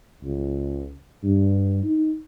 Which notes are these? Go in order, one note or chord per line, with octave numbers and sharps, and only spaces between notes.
C#2
G2
D#4